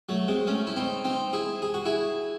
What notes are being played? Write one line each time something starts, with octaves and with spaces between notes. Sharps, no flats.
F#3 A3
G#3 C4
A3 C#4
E4
C4 D#4
C4 D#4
E4 G#4
G#4
F#4
E4 G#4